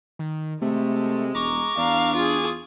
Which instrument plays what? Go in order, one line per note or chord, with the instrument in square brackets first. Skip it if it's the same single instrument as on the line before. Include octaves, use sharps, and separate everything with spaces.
[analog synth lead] D#3
[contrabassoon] C3 [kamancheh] G#3 [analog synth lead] A3
[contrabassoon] E1 [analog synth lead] A#5 [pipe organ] C#6 D6
[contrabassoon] E2 [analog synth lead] D4 [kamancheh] F5 A#5
[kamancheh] F4 G#4